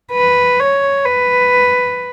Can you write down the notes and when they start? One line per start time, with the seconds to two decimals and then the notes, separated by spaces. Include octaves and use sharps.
0.13 B4
0.60 C#5
1.05 B4